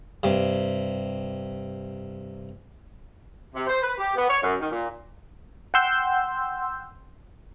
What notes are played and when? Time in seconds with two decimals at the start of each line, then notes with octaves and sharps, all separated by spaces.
0.23 G2 C3
3.55 C3
3.67 C5
3.83 B4
3.98 G4
4.16 B3
4.29 C#5
4.43 F#2
4.59 D#3
4.71 A#2
5.74 F#5 G5 C6 E6 G6